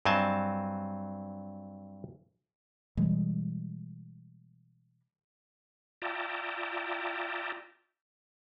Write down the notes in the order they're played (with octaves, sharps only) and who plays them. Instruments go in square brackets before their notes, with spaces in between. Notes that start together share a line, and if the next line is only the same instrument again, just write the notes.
[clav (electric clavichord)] G2 F#3 C4 D#5 G#5 A5
[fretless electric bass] B2 E3 G3 G#3
[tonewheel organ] F4 D5 E5 G5 A5 A#5